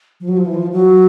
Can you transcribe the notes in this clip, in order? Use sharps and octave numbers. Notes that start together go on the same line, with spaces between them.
F3
F#3
F3
E3
F3
F#3